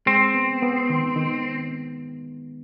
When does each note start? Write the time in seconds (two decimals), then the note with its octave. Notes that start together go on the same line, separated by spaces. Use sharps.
0.06 G#3 C4
0.34 B3
0.62 B3
0.90 D#3
1.16 D#3